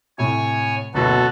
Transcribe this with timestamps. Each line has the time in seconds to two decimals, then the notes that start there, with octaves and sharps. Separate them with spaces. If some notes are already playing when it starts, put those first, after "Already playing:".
0.18 A2 C3 C#5 G#5
0.94 F#1 D2 B2 B3 F#4 A4